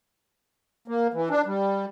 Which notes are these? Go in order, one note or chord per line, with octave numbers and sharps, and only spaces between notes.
A#3
E3
D4
G3